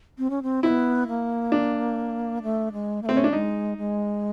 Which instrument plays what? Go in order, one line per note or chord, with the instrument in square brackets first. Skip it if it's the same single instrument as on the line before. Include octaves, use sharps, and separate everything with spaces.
[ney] C4
C#4
C4
[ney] B3 C4 [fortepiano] E4
[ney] A#3
[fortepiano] D4
[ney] A3
G#3
A#3
[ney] A3 [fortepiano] C4
[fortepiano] C#4
D4
[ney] G#3 [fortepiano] D#4
[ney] G#3